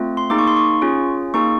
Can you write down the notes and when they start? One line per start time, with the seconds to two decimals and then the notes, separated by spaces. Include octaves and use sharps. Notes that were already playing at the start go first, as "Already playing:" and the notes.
Already playing: A3 C4 F4
0.17 C6
0.30 A#3 D#4 G#4 D6
0.39 C#6
0.48 C6
0.56 C#6
0.82 C#4 F4 G#4
1.34 A#3 D#4 G#4 C#6